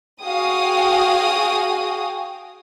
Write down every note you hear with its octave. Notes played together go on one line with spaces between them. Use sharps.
F#4 G#4 F5 G5 D#6